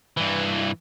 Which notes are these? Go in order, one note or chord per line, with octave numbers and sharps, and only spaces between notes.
G2 E3